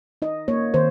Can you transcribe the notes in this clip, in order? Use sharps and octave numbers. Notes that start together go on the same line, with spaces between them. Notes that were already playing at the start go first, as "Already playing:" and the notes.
D#4 D#5
A#3 C#5
D#3 C5